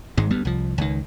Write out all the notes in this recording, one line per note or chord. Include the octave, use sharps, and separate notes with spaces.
G#1 G#2 G#3
D2 G3 B3
C2 F3
C#2 D#3